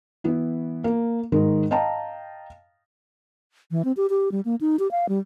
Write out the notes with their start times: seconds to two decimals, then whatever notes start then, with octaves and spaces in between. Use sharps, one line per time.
0.24 E3 B3 E4
0.84 A#3
1.32 G#2 D#3 A#4
1.71 D#5 F5 G5 A5 A#5
3.71 E3
3.85 C4
3.97 G4
4.10 G4
4.32 G3
4.45 A#3
4.61 D#4
4.79 G4
4.91 F5
5.09 G3